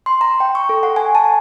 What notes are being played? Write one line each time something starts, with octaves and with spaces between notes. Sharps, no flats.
C6
A#5
G5
C#6
A4
F#5
G#5
A5